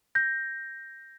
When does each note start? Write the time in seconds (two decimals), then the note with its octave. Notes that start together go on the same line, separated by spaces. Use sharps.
0.15 G6 A#6